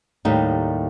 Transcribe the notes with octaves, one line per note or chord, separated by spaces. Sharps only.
D#2 A2 G3 D#4